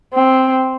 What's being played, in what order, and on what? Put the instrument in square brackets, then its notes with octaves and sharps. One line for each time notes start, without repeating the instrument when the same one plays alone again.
[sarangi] C4